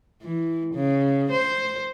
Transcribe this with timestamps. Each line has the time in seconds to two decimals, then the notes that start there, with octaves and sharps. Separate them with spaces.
0.22 E3
0.74 C#3
1.31 C5